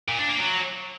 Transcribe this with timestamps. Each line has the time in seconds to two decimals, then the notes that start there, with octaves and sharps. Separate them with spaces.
0.08 A#2
0.19 D4
0.29 A#3
0.39 F#3